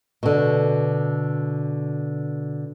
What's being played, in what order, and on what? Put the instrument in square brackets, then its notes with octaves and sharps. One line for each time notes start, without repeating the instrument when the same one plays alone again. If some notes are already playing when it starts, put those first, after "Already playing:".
[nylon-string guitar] B2 D3